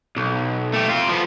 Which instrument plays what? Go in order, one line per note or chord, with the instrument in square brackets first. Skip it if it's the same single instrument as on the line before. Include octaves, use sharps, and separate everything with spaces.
[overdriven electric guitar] B1
A3 G4
C4 F4
F3 B3